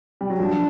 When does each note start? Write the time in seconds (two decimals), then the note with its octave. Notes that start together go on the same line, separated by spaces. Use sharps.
0.21 G3
0.30 F#3
0.39 F3 D4